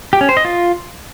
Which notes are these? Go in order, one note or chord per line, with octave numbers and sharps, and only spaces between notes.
G4
C#4
C5
D#5
F4